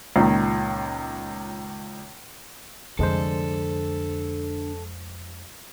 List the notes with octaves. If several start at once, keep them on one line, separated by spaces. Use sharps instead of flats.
C#2 A#2 D#3
C2 F2 D3 G#3 A4 C5